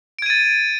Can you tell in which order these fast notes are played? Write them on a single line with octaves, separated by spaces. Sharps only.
D7 G#6 D#7 A6